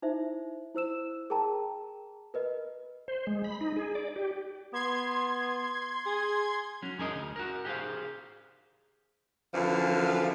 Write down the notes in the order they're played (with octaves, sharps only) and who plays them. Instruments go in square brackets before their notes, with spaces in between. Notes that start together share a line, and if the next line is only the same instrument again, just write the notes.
[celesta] D#4 E4 C5 E5
E4 C5 E6 E7
G#4 A#4 G5 A5 A#5
A#4 B4 D#5
[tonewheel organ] C5
G#3
B5
D#4
G#4
D5
G4
[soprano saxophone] B3 [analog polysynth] C6 G#6
[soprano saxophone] G#4
[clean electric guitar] F#3 C#4
F#2 G#4 A#4 D#5
D2
F#4 A#4
G4 G#4 C5 F5
[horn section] F#2 D3 E3 F3 F5